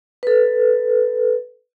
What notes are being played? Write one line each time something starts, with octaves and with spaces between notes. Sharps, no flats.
A4 B4